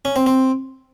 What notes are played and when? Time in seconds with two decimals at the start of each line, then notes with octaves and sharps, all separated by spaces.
0.05 C#4
0.16 C4
0.27 C4